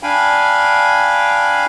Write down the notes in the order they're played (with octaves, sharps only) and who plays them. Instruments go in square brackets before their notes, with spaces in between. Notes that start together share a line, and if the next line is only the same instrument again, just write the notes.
[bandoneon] D4 F5 G5 G#5 B5